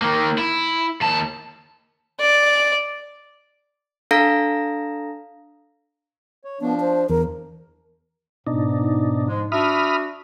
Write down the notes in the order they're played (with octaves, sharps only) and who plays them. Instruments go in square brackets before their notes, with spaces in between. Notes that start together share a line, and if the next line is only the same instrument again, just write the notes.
[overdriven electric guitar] D#3 A#3
E4
D#2 A5
[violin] D5
[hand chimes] D4 A4 F5 A#5 A#6
[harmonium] C#5
[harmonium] F3 D4 [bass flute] B3
[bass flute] C5
[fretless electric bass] E2 [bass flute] A#4
[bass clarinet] G#2 [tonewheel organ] B2 D4 D#4
[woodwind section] F3 G#3
[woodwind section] D4 F#4 E5 [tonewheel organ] B5 D#6 F6